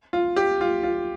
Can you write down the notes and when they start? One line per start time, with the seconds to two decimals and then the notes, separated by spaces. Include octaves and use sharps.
0.13 F4
0.36 G4
0.61 F4
0.83 F4